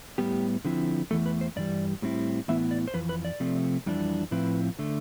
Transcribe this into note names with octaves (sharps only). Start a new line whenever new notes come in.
A2 G3 B3 G4
D3 F3 C4 E4
E2 C3 E3 A3 A4
B4
C5
G2 E3 G3 D5
A2 G3 C4 E4
A2 E3 B3 E4 E5
D5
C5
F2 E3 B4
B4
D5
C3 F3 A3 C4
F2 E3 G3 D4
A2 F3 C4 E4 B4
D3 A3